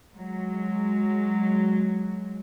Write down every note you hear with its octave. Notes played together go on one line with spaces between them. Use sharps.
F#3 G#3